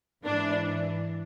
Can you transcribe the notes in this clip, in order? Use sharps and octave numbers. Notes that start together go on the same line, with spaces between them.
G#2 E3 D4